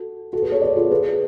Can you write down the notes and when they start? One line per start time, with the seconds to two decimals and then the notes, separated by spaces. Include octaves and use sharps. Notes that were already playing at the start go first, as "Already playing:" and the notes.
Already playing: F#4 A4
0.33 F#4 A4
0.42 G#4 B4
0.52 A4 C#5
0.62 B4 D5
0.76 F4 G#4
0.91 G#4 B4